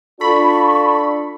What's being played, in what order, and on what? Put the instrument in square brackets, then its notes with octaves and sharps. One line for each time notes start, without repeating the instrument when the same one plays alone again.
[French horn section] D4 F4 [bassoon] A4 [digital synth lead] B5 [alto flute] C#6